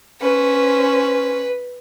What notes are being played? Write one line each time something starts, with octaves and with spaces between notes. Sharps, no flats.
C#4 B4 C5